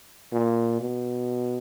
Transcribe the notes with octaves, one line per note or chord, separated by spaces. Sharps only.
A#2
B2